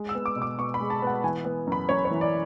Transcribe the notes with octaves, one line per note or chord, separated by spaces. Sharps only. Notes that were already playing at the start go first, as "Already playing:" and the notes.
Already playing: G#3
E6
B3
D6
B2
D6
B2 C#6
B5
G#3
A5
B3 F#5
E3 G#5
B3
F#2 B5
F#2 C#5
C#5
E3
D5